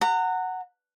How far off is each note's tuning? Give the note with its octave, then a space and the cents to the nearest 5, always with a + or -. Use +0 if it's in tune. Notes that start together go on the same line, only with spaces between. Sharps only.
F#5 +0 A#5 -30